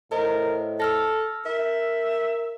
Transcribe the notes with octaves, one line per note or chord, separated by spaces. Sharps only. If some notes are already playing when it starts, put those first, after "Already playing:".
A2 A#4 C5 D#5
A4 E6 F6 A#6
A#4 E5